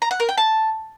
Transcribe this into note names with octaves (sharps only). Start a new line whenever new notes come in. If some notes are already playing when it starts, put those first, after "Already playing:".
A#5
F#5
A#4
G5
A5